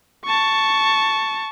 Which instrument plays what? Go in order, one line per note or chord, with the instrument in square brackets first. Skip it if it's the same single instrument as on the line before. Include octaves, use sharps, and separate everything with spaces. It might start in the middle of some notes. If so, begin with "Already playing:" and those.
[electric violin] A5 C#6